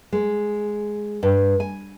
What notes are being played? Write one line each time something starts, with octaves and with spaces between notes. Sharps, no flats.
G#3
G2
G#5